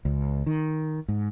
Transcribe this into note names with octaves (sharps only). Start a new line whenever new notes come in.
C#2
D#3
G#2